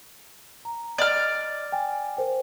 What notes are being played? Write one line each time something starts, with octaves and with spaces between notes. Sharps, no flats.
A#5
D5 D#5 F6
G5 G#5
A#4 C5 G5